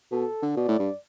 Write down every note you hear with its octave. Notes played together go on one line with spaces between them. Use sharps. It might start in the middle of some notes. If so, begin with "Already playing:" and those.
B2 A4
D3
B2 D5
A2
G2